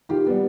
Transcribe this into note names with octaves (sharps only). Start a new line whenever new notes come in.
D#3 F4 G4
G3 B3